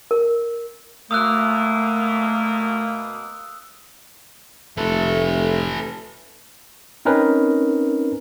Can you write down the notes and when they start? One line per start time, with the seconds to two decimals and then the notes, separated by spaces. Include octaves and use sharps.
0.11 A#4
1.11 B2 A3 A#3 D#6 E6 F#6
4.78 F1 A3 A4 B4
7.05 C4 C#4 D#4 A#4 B4